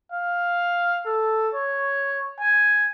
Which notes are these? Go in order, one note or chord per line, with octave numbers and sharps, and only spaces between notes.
F5
A4
C#5
G#5